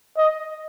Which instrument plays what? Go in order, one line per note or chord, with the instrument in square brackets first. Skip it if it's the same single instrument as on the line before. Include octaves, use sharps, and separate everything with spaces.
[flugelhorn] D#5